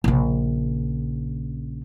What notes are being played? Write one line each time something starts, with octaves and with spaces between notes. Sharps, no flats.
A#1 C#3